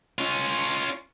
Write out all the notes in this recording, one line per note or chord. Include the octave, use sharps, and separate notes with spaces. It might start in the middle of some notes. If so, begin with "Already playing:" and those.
C#4 F4